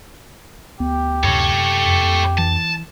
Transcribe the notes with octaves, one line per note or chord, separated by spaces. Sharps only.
D2 B3 G4
F#2 C3 A4 C#5
F2
E3 A5